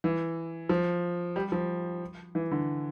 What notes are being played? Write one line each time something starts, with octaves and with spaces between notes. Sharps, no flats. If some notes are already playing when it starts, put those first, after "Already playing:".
E3
F3
G3
F3
E3
D3